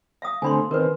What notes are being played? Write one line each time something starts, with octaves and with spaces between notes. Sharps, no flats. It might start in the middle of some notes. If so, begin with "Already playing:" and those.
E5 F5 D#6
D3 A3 C4 G#5 B5 C6
D#3 C4 A#4 B4